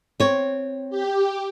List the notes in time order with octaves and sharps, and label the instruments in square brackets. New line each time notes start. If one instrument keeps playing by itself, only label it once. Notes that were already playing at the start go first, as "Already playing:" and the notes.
[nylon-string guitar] C4 C#5
[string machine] G4